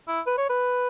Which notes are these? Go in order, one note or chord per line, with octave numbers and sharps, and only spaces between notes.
E4
B4
C#5
B4